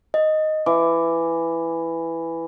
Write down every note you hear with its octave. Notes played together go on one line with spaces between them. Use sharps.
D#5
E3 D6